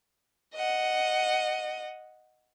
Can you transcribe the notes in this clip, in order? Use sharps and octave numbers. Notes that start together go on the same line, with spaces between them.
D#5 F#5